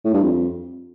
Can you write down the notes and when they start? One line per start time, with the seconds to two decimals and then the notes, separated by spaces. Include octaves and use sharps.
0.05 A2
0.14 G2
0.23 F2